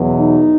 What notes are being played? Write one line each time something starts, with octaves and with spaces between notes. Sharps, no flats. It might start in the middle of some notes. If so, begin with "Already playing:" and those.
Already playing: E2 B2 F#3
D#4